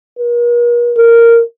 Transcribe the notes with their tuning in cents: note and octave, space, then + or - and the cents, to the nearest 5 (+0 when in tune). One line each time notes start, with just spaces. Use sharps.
A#4 +45
A#4 -5